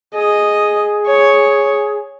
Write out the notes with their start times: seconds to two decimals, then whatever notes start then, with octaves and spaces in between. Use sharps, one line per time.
0.15 G#4 D#5
1.06 C#5